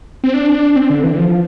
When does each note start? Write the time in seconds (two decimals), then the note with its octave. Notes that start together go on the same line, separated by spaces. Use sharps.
0.24 C4
0.34 D4
0.76 C4
0.90 D3
1.04 E3
1.18 F3